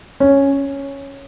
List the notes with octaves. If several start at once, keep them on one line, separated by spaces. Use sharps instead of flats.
C#4